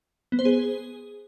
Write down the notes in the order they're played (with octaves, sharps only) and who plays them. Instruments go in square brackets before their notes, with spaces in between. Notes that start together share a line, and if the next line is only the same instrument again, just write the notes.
[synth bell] B3
C5
G#4